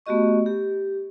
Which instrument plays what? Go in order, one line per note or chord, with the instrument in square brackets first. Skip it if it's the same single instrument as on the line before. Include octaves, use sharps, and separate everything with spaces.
[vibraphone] A3 B3 F#4 G4 D#5 C#6
G4